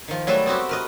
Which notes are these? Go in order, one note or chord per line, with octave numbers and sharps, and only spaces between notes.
D#3 F3
F#3 G3 A3 B4 E5
B3 C4 F#4 G4
A#4 B4 D#5